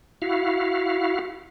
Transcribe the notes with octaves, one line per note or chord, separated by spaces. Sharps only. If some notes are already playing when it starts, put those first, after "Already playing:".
E4 F#4 F5